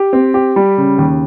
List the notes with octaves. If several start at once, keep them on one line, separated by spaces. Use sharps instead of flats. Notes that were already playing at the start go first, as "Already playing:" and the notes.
Already playing: G4
C4
G4
G3
C#3
D#2